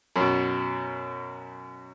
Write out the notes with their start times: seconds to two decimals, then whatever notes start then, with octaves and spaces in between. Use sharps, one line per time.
0.16 F#2 B2